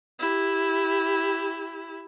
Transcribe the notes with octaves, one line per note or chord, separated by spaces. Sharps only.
E4 G4